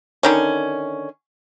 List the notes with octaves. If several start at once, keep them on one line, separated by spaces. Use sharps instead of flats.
D3 D#3 C#4